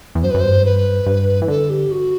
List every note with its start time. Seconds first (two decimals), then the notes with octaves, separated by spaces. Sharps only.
0.15 E2
0.23 F#2 C5
0.31 B4
0.34 F#2
0.40 G2 C5
0.65 B4
1.06 G2
1.42 E3
1.48 D3 A4
1.70 G4
1.91 F#4